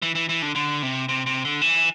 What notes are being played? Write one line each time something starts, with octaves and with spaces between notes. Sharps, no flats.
E3
E3
E3
D3
D3
C3
C3
C3
D3
E3